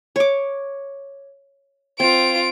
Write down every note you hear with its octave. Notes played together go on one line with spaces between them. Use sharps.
C#5 D6
C4 F4 D7